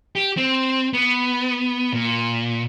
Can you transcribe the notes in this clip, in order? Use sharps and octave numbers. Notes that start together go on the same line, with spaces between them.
G4
C4
B3
A#2